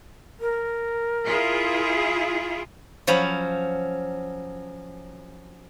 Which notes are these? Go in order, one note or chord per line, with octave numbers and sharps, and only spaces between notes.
A#4
E4 F4 G#4
F3 F#3 C#4 B5